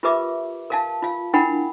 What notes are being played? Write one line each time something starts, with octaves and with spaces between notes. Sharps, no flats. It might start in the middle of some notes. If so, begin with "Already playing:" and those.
F4 G4 A#4 B4 E5 D6
A#4 F5 A5
F4 F5
D4 E4 A#4 F#5 G5 B5